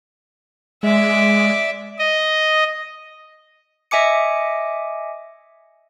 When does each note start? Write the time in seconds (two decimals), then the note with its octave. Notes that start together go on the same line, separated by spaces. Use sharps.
0.83 G#3 D5 E5
1.99 D#5
3.91 D#5 E5 G#5 D6 C#7